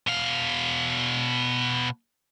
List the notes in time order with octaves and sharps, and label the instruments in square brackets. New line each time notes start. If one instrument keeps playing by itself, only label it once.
[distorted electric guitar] B2 F5